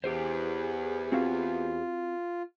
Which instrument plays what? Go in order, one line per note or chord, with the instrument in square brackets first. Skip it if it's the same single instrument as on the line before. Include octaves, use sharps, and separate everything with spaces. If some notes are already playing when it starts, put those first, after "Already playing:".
[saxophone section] E2 [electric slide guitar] G4 G#4 C5
[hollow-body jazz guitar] C4 F#4 F5 [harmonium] F4